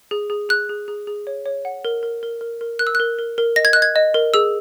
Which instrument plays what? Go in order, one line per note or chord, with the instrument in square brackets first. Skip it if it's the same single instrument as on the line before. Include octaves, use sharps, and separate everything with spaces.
[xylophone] G#4
G#4
G#4 F#6
G#4
G#4
G#4
C#5
C#5
F#5
A#4
A#4
A#4
A#4
A#4
A#4 F#6
E6
A#4 F#6
A#4
A#4
D#5 A#6
G#6
D#5 F#6
G#6
D#5
A#4
G#4 E6